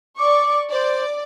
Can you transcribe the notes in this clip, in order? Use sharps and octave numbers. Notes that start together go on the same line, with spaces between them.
D5 C#6 D6
C5 D5